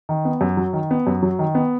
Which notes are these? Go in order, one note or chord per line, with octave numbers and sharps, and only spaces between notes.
D#3
B3
F#2
F#3
D#3
B3
F#2
F#3
D#3
B3